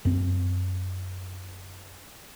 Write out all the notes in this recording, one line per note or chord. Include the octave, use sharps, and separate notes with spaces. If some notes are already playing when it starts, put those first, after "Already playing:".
F#2 C4